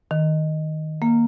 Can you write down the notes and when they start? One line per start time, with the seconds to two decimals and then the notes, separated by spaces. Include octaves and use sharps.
0.11 D#3
1.02 A#3